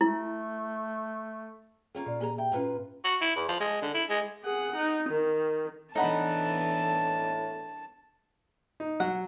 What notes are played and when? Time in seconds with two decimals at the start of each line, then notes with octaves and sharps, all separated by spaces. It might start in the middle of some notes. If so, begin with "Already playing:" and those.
0.01 A3 E4
1.95 A#3 C#4 F4 G#4
2.06 A#2 D5
2.21 A#3 G4 G#4 G#5 A#5
2.38 E5 G5
2.52 G#2 A#3 C#4 F4 B4
3.04 F#4
3.21 E4
3.36 E2
3.48 F3
3.61 G#3
3.82 D3
3.94 E4
4.10 G#3
4.44 G#4 F#5
4.76 D#4
5.09 D#3
5.95 A2 E3 B3 D4 D#4 F#5 A5 B5
8.80 D#4
9.00 F#3 F#5